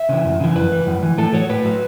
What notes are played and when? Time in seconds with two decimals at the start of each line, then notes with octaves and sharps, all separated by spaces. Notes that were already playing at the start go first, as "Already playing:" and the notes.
Already playing: E5
0.09 C#3 E3
0.25 F#2
0.40 C#3 E3
0.55 F#2 B4
0.72 E3
0.87 F#2
1.02 E3
1.18 A2 A4
1.34 F#3 C#5
1.49 A2 B4
1.65 F#3